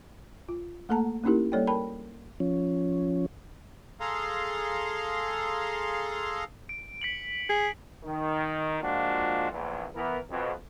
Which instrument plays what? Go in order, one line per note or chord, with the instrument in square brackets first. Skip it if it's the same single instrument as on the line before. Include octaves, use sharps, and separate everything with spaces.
[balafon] F4
A3 A#3 A4 F#5 A5 A#5
A#3 C#4 D#4 E4 G4 A#4
G3 A#3 A4 C#5 D5 G5
A#4 G5 A5 B5
[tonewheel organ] F3 C#4
[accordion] G#4 A4 F5 A#5 C6
[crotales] D7
B6 C#7 F#7
[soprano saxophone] G#4
[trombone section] D#3
F3 G#3 A#3 D4 F4 F#4
A#1 E2
E3 B3 A#4
F2 B2